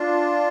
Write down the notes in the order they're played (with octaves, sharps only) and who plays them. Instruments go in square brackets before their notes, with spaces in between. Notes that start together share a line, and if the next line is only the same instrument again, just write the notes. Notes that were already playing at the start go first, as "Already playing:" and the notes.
Already playing: [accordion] D4 F4